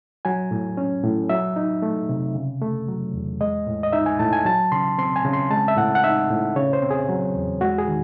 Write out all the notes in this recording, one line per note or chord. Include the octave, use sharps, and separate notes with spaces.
F#3 G#5
A2
C#4
A2
F#3 E5
D#4
A3
C3
C#3
A3
F#3
E2
G#3 D#5
A2
D#5
D#4 E5
G#5
A2 A5
G#5
F#3 A5
C#3 C6
C4 C6
G#5
C#3
C6
G#3 A5
E5
A2 F#5
F#5
D#4 E5
A2
C#3 C#5
C5
C4
G#4
F#3
E2
G#3 F#4
G#4
D#3